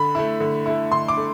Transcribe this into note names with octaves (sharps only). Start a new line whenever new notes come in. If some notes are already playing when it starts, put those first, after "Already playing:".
Already playing: D3 B5
A3 E4
D3
A3 E4
D3 C6
D6
A3